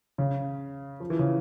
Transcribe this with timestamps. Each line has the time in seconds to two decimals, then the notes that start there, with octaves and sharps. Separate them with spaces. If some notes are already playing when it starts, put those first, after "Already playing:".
0.18 C#3
1.00 F3
1.10 E3
1.19 C#3